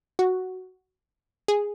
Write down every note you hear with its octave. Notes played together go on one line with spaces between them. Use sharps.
F#4
G#4